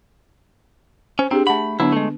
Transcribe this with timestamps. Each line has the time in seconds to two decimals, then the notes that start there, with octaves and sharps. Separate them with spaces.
1.19 C#4 C5
1.31 C4 D4 G4 G#4
1.47 A3 F#5 A5 B5
1.80 D3 F#3 B3 D4 E4
1.92 G#3 A3